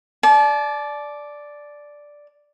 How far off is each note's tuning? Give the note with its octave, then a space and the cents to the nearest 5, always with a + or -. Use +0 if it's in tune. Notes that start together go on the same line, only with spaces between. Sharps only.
D5 +0 A5 -35